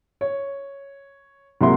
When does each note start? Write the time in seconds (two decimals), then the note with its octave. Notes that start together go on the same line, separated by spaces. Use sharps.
0.21 C#5
1.61 C2 F#3 G#3 A#3 E4 C6